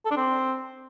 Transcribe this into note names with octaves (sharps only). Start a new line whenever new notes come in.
A4
D4
C4